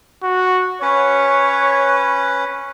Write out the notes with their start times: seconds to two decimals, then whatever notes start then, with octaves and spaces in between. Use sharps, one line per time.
0.24 F#4
0.82 C#4 B4 C#5